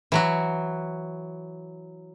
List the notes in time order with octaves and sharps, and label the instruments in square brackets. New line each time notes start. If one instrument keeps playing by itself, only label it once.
[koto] E3 F#3 F#4